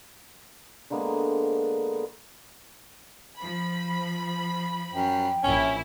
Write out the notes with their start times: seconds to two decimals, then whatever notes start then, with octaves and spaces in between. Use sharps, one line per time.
0.90 D3 G#3 A#3 B3
3.38 F3 B5
4.94 F#2 G5
5.43 A#1 C#4 E4